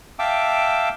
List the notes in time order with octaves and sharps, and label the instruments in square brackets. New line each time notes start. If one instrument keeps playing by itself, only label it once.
[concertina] E5 F5 G5 A5 D6 E6